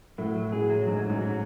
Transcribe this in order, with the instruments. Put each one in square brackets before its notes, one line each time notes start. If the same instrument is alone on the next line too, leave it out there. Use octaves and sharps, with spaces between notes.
[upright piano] A2 [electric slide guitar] F#3
[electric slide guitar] F#3
[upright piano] A2 [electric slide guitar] G#4
[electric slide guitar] F#3
[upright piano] G#2 [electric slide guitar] F#3
[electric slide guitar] F#3
[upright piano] G#2
[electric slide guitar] F#3